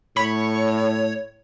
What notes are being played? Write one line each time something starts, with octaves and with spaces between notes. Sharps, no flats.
A2 C#5 B5